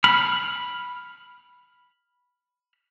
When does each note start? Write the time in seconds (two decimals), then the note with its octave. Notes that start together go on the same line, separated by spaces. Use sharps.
0.04 B5 F6